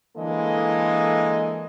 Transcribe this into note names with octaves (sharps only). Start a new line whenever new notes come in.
D3 E3 G#3 A#3 A4 D#5